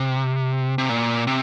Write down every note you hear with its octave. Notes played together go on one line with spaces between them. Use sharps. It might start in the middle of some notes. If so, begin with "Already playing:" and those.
Already playing: C3
C3
A#2
C3